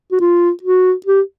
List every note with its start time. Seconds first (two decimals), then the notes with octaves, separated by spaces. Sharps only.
0.11 F#4
0.21 F4
0.63 F#4
1.06 G4